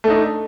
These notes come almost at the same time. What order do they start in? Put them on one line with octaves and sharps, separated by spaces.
A3 D4 D#4